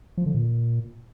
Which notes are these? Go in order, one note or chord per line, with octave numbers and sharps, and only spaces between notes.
F3
D3
A#2